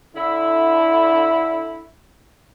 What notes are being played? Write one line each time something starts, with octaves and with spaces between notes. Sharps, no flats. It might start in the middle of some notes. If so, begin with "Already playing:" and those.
D3 E4